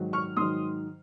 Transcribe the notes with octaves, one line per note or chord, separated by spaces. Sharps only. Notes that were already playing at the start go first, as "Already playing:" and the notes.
Already playing: G#2 D#3 F#3
C#6 F6
G#2 D#3 F#3 C6 D#6